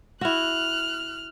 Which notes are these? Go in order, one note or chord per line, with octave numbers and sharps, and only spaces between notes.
E4 F#4 F6 F#6